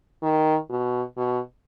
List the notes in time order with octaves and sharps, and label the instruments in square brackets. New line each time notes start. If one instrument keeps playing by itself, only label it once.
[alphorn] D#3
B2
B2